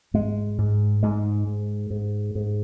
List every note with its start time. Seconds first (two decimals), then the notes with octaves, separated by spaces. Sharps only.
0.14 G#2 G#3
0.58 G#2
1.03 G#2 G#3
1.47 G#2
1.90 G#2
2.35 G#2